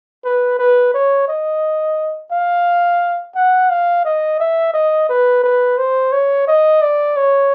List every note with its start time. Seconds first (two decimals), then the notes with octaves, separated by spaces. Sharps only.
0.25 B4
0.59 B4
0.94 C#5
1.28 D#5
2.32 F5
3.35 F#5
3.70 F5
4.05 D#5
4.40 E5
4.74 D#5
5.09 B4
5.44 B4
5.78 C5
6.12 C#5
6.47 D#5
6.82 D5
7.16 C#5